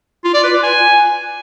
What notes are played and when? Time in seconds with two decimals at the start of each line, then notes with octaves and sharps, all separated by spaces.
0.24 F4
0.34 D5
0.43 B4
0.53 F4
0.63 G#5